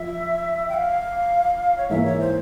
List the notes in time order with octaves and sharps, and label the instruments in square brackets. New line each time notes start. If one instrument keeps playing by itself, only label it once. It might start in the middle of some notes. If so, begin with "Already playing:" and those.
Already playing: [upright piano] F3 [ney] E5
[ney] G5
F5
C#5
[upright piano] G#2 E3 A#3 [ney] E5
[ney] C#5
C5